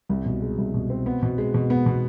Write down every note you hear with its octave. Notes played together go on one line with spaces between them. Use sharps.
C2
B2
G#3
C2
B2
C4
B3
B2
G#3
B2
B3
B2